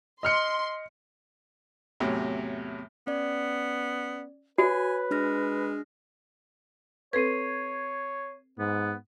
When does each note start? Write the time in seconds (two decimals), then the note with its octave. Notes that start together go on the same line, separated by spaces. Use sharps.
0.23 D#5 C6 F6 C#7
2.00 E2 A2 C3 F#3
3.07 B3 C#4 D5
4.58 F#4 B4 C#5 G#5
5.11 G#3 D4 F6 A#6
7.13 C4 A4 B4 C#5 G#6 C7 D#7
8.58 G#2 B3